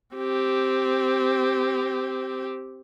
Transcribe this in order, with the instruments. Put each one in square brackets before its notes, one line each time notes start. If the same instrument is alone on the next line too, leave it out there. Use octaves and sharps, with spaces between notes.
[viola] C4 G4